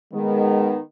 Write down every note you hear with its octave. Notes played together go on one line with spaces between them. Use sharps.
D#3 G#3 B3